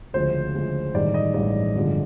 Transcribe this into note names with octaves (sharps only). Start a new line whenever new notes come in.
D2 C#3 F3 G#3 C5
D2 C#3 F3 G#3
A1 G2 D#3 G#3 D5
D#5
A1 G2 D#3 G#3 D5
G1 G2 D3 F3 G#3